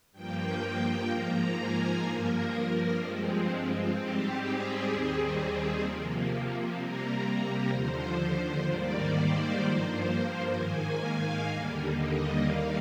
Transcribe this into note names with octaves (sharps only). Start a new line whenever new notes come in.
G2 F3 A#3 G5
G#2 F3 A#3 A#5
G#5
G2 F3 A#3 A#4
G2 F3 G#3 C4
G#2 G3 C4 G4
G#4
D#2 D#3 G3 C4 G#4
C3 F3 A#3
C3 G3 A#3 A#4
D#2 D3 F3 C5
G#2 D#3 G3 A#3 D5
C5
G2 F3 A#3
G#2 D#3 A#3 G#5
F5
D#2 D3 G3 A#3
D#5
D#2 D#3 G3 A#3 F5